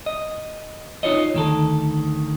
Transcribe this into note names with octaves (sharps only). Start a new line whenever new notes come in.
D#5
D#4 F4 C#5 D#5
D2 D#3 A4